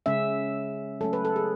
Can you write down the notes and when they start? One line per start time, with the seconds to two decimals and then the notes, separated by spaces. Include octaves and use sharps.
0.06 C#3 G#3 C#4 E5
1.01 F#3 A3 C#4 A4
1.13 B4
1.25 A4
1.36 G#4